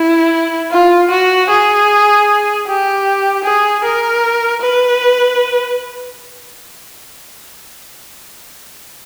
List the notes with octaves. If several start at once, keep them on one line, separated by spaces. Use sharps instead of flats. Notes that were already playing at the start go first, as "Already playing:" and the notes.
Already playing: E4
F4
F#4
G#4
G4
G#4
A#4
B4